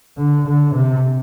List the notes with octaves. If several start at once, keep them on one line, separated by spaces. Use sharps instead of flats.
D3
D3
C3